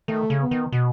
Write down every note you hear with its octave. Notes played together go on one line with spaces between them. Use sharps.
D#3 A3
C#3
B3
D#3
B2